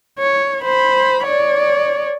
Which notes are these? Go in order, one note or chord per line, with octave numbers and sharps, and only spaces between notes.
C#5
C5 B5
C#5 D5